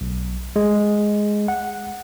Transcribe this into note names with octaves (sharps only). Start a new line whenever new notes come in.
B1
G#3
F#5